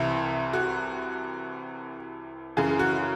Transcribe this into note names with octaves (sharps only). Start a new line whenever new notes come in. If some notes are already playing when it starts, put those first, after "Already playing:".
Already playing: C2 C3 E3 E4
F#4
F#2 C#3 E3 G#4
F#4